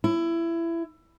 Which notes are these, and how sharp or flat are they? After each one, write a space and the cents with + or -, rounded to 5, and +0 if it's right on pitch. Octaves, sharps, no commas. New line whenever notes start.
E4 +20